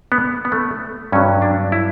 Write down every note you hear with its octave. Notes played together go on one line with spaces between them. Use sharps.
B3
B3
A3
G2 F#3 C#4
D4
E4